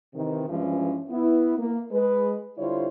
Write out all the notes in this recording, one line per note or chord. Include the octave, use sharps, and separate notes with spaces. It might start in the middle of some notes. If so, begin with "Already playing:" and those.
C3 D#3 E3
G2 E3 F3 G#3 C#4
B3 E4
A#3
G#3 B4
D3 G3 E4 F4 C5 C#5